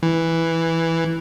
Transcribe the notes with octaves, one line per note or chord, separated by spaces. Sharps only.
E3